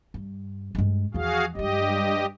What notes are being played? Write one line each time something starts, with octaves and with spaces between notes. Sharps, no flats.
G2
G2 G#3
E2 F3 F#4 G#4 F5
G2 F#3 G#3 G4 D#5